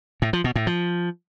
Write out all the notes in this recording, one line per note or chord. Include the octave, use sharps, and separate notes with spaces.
A2
F3
B2
A2
F3